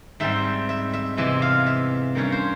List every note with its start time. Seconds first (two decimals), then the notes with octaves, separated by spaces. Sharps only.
0.20 G#2 G3 C4 E5
0.69 E5
0.94 E5
1.17 E2 C3 E3 G#3 E5
1.42 F5
1.66 E5
2.15 G2 G3 A#3 C#4 C#5
2.32 C5